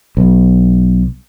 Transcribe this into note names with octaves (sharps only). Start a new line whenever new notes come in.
B1